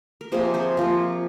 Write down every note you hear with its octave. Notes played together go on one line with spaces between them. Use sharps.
A#4
C3 F3 A#3 G#4 C5
G#4 C5
C3 F3 A#3 F4